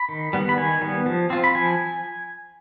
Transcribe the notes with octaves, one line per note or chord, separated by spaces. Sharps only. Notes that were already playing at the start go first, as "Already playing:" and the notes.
Already playing: B5
D#3
G3 B3
B5
D#3 G#5
G3 B3
F3
C4 F4
B5
F3 G#5